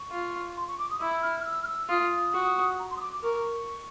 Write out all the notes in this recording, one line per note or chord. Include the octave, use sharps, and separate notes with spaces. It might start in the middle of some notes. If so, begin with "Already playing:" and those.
Already playing: C#6
F4
C6
C#6
D6
D#6
E4 E6
F6
F6
E6
F6
E6
F4 D#6
F#4
A#5
C6
D#6
D6
D6
A#4 C#6